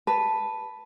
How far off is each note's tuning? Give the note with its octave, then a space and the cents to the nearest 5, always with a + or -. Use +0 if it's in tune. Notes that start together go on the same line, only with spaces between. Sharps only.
B4 +0 A5 +0